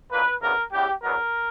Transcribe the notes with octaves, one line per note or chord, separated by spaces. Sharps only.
B1 A#2 A#3 B4
D2 C#3 E3 B3 A#4
E2 C#3 E3 G4
E2 B2 F#3 B3 A#4